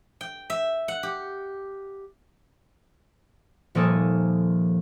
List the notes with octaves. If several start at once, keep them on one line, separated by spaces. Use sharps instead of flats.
G5
E5
F#5
G4
D#1 F3 A#3 A4 G#5 D#6